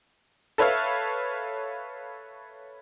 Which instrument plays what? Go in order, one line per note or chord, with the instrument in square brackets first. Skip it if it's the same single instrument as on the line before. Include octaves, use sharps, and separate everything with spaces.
[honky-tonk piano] A4 B4 C#5 E5 F5